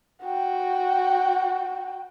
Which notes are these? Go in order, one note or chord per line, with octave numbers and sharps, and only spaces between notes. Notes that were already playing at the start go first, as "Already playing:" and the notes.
F#4 G5